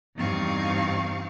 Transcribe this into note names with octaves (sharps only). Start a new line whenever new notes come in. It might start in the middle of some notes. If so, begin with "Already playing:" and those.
E2 G2 C4 D#4 F5 C#6